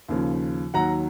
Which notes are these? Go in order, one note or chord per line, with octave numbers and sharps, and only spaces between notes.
D#2 C#3 F3
D#2 D#3 F#3 F#5 A#5